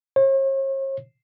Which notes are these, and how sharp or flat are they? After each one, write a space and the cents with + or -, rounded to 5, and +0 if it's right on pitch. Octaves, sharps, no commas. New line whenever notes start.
C#5 -45